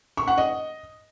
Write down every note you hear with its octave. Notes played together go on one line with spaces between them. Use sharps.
C#6
F#5
D#5